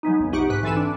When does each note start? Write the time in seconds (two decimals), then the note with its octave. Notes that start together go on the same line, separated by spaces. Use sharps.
0.03 F#3 G#3 B3 D#4
0.20 B1 F2
0.32 C3 D#4 G4 F#5 C#6 D7
0.50 G#2 B4 F#6
0.63 E3 C4 A4 G#5 B5 E7
0.77 D4